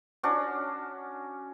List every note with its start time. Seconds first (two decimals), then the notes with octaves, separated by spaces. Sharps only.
0.23 C#4 D4 F#4